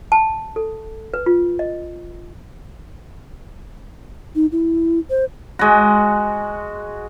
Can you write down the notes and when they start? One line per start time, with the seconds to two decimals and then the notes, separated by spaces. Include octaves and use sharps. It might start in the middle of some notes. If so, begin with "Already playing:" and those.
0.12 A5
0.56 A4
1.14 B4
1.26 F4
1.59 D#5
4.35 D#4
4.52 E4
5.10 C5
5.59 G#3 F#4